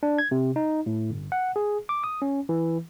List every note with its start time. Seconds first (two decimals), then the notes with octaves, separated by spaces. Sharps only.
0.03 D4
0.18 G#6
0.31 C3
0.56 D#4
0.86 A2
1.10 G1
1.32 F#5
1.56 G#4
1.89 D6
2.04 D#6
2.22 C#4
2.49 E3